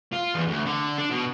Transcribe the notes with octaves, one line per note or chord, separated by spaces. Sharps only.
F4
E2
D2
D3
D4
B2